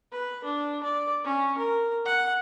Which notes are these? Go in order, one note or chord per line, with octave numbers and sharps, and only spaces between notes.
B4
D4
D5
C#4
A#4
F#5